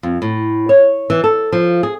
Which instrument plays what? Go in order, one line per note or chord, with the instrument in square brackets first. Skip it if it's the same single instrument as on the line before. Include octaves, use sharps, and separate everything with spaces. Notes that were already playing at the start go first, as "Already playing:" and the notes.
[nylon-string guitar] F2
A2
C#5
E3
A4
F3
G#4